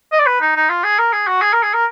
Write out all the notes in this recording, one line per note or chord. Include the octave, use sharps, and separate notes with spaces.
D#5
D5
B4
D#4
D#4
F4
G#4
A#4
G#4
F#4
G#4
A#4
G#4
A#4